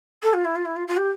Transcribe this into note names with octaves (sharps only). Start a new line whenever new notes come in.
A4
F4
E4
F4
E4
F4
F4
G4